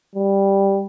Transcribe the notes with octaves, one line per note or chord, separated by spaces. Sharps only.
G3